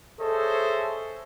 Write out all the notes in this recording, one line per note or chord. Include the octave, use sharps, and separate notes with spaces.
G#4 A4 C5 C#5 D#5 E5